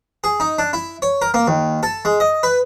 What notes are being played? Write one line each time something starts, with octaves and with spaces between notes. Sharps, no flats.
G#4
D#4
D4
E4
C#5
A#4
A#3
D#2
A4
G#3
D#5
B4